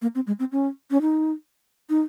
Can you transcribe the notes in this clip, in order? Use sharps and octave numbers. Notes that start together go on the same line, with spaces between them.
A#3
C4
G#3
C4
C#4
C#4
D#4
D#4